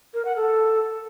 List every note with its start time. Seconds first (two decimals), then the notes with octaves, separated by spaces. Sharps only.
0.14 A#4
0.25 F#5
0.36 A4